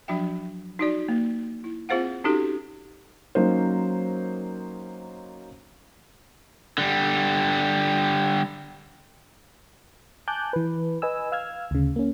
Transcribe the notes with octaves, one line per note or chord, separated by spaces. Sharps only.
F3 F#3 D4 F#4 E5 G5
D#4 F#4 D5
A#3
E4
C4 F4 G#4 C5 F5 F#5
C#4 D#4 F#4 G4 A4
F#3 A#3 C#4 D#4 A#4 C5
D3 G3
G#5 A5 D6 F#6 G6
E3 B4
B4 D#5 G#5 E6
F5 E6 F6 G#6
D2 C#3
A#3 C#4